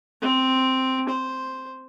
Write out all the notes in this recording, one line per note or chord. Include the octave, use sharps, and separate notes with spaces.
C4
C5